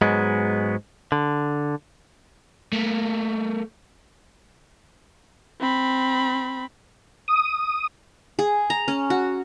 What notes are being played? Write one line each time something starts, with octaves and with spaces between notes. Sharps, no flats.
G#2 F#3 G#3 B3
D3
A3 A#3
C4 B5
D#6
G#4
A#5
C#4
F#4